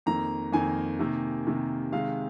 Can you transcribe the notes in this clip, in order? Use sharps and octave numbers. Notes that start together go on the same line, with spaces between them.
F2 D#3 A#3 A#5
F2 D#3 A#3 G#5
C3 D#3 A#3
C3 D#3 A#3
C3 D#3 G#3 F5